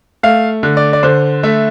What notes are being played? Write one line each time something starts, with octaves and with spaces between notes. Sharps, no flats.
A3 F5
D3
D5
D5
D3 C5
A3 E5